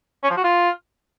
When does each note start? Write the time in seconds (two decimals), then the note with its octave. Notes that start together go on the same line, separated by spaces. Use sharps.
0.23 C#4
0.30 F3
0.37 F#4
0.44 F4